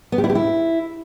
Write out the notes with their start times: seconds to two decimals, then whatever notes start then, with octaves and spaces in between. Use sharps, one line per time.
0.12 B3
0.18 G4
0.24 E4
0.30 G4
0.35 E4